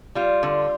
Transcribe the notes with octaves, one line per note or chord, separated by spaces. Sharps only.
G3 F4
D3